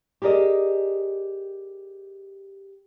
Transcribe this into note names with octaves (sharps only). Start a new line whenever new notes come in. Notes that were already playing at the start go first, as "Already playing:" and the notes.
G4 G#4 A#4 D5 D#5